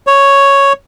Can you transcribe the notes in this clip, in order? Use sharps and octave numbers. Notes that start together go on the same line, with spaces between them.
C#5